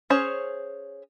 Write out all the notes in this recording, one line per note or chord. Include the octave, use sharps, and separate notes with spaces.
C#4 G#4 C5 C#5